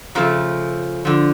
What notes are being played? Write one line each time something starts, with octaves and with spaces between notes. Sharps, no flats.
C#3 F3 A3
D3 F3